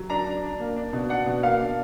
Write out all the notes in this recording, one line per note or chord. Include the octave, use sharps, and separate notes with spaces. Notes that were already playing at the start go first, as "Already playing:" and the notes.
Already playing: F#3
D4 A#5
D4
D4
A#3
D4
B2
D4 F#5
B2
A#3 F5
D4